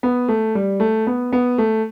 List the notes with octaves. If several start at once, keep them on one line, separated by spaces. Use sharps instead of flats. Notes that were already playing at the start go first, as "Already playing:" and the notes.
B3
A3
G3
A3
B3
B3
A3